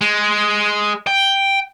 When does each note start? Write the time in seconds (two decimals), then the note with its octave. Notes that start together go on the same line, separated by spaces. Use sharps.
0.01 G#3
1.07 G5